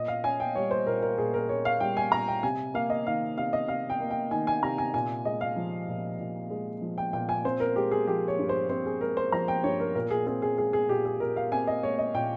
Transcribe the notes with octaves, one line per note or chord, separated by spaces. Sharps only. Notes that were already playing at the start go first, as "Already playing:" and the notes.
Already playing: A#2 D#5
F5
C#4 G#5
G5
G3 C#5
C5
A#2 A#4
A#4
A#2 G#4
A#4
C#4 C#5
F5
G3 G5
G#5
A#2 A#5
G5
C3 G#5
A#3 F5
D#5
D#3 F5
C3 F5
D#5
C3 F5
G5
A#3
G5
D#3 G#5
G#5
C3 A#5
G#5
A#2 G#5
G#3 D#5
F5
F3
A#2
A#2
G#3
F3
G5
A#2 G5
G#5
C4 C5
A#4
G#3 G4
G#4
F3 G4
C#5
G2
C5
C4 C5
G#4
G#3 A#4
C5
F3 A#5
G5
G2 C#5
A#4
A#2 A#4
G#4
C4 G#4
G#4
G#3 G#4
G#4
A#2 G4
G#4
A#2 A#4
F5
C4 G#5
D#5
G#3 C#5
D#5
A#2 G5